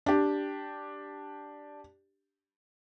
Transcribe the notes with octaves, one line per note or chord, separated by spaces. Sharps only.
D4 G4